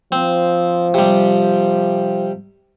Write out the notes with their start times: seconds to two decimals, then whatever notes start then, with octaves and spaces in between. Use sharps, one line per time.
0.12 F3 C4
0.94 C3 G3